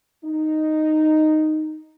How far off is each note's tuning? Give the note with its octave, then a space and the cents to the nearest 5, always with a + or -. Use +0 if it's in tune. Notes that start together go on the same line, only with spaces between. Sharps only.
D#4 -5